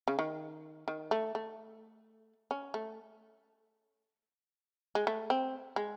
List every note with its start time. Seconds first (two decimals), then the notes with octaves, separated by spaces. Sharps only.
0.08 C#3
0.19 D#3
0.88 D#3
1.11 A3
1.35 A3
2.51 C#4
2.74 A3
4.95 G#3
5.07 A3
5.30 C4
5.76 G#3